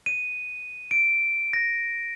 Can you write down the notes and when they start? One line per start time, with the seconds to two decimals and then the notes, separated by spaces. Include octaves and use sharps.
0.06 D#7
0.91 D7
1.53 A#6